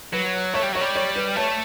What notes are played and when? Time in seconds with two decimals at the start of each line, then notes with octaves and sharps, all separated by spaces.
0.13 F#3 B4
0.54 A3 C#5
0.63 G3
0.72 F#3 C#5
0.81 G3
0.96 C#5
1.16 B4
1.36 A3 C#5